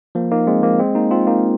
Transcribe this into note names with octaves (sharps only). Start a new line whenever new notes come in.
F3 A#3
A#3 D#4
G#3 C4
F3 A#3
G#3 C4
A#3 D#4
C4 F4
A#3 D#4